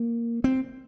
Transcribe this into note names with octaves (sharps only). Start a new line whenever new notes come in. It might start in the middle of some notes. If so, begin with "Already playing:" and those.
Already playing: A#3
C4